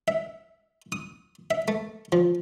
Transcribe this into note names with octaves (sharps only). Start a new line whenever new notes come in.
E5
D#6
E5
A3
F3